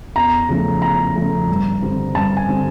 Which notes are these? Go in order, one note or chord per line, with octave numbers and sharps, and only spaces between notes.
E2 A#5
C#3 F3 A3
E2 A#5
C#3 F3 A3
G2
D3 G3 C4
G2 A5
G#5
D3 G3 C4